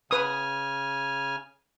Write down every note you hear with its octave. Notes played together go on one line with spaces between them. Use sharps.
C#3 B4 G#5 D#6 F6